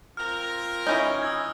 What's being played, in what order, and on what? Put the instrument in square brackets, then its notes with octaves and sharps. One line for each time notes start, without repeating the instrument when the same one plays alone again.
[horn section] C4 F4 A#4 [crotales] F6
[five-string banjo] E3 C#4 D#4 [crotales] G7
[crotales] D#6 E6 G#6